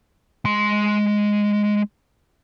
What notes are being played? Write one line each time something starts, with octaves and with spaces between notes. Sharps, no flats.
G#3 C6